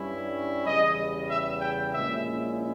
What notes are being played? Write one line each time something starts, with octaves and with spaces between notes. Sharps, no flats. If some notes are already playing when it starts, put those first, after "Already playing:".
Already playing: G2 G3 C#4 E4
E2 C#3 G3 D#5
E5
G5
A#1 A#2 G#3 C#4 E4 E5